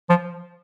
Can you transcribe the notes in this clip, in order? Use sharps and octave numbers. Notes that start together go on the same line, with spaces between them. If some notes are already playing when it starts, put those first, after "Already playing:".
F3